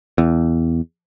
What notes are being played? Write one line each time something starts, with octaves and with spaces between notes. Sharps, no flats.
E2